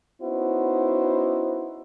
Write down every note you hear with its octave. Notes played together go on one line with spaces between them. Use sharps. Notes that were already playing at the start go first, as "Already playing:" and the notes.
B3 C#4 D#4 E4 F#4 C5